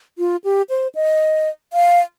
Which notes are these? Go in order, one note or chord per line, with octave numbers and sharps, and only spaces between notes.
F4
G4
C5
D#5
F5